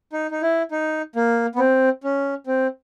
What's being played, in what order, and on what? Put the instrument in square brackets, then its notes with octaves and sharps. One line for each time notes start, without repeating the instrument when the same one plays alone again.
[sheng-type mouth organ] D#4
D#4
E4
D#4
A#3
B3
C4
C#4
C4